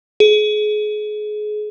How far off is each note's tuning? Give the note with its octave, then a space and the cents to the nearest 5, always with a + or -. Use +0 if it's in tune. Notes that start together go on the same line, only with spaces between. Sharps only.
G#4 +30